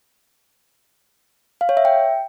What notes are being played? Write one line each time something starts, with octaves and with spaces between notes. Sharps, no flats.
F5
C#5
E5
G5